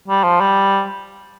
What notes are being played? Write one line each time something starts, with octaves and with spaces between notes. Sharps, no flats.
G3
F3
G3